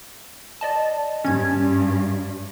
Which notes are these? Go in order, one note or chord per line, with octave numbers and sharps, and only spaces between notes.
D5 D#5 A5
G2 C#4 G#6